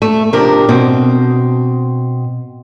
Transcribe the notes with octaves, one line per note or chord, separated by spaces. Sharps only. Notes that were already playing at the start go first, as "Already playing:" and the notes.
A3
C3 F3 D4 G4 A#4
B2 C4